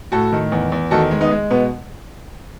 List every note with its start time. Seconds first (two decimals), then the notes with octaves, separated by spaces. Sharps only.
0.12 A2 F#4 A4
0.32 D#3
0.52 E2
0.72 E2
0.91 D#3 F#4 A4
1.11 G#3
1.20 B3 D#4
1.31 G#3
1.51 B2 B3